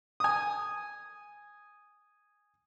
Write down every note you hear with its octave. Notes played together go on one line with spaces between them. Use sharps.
G#5 D#6